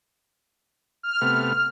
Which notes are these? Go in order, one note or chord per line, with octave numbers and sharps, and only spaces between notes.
F6
C3 A3 B3